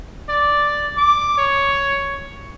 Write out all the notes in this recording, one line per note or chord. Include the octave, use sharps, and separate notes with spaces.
D5
D6
C#5